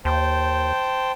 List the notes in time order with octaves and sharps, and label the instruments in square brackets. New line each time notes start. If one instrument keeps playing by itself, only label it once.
[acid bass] D#2 [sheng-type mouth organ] C5 G5 A5